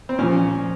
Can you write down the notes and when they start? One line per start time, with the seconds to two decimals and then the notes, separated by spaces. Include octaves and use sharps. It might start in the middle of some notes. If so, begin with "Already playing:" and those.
0.09 C4
0.19 A#2 F3 C#4